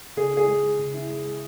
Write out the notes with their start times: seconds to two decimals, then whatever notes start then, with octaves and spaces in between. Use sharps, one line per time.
0.17 C#3 G#4
0.33 E4 G#4
0.48 G#3
0.63 G#4
0.79 C#3
0.94 E4
1.09 G#3
1.25 G#4